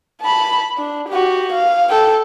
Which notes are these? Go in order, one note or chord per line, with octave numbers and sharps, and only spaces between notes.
A5 B5
D4
F#4 G4
F5
A4 G5